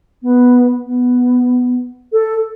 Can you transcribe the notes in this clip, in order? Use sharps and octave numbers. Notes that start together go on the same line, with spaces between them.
B3
B3
A4